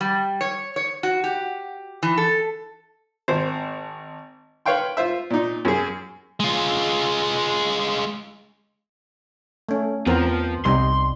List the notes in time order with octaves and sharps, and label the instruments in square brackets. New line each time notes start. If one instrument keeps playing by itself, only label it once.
[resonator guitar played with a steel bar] G3
C#5
C#5
F#4
G4
E3
A4
[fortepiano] G#1 C5
B4 C#5 F5 G5 C6
F4 C5 E5
A#2 D#4
F#2 G#4
[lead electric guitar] G#3 F4
[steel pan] A3 C#4
[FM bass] E2 [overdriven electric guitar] F3 [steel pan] B3 C4 A#4
[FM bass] C2 [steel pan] G3 C4 D#4 [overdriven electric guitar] C6